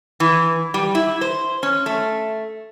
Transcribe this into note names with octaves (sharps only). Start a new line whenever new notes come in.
E3
G3
E4
C5
C#4
A3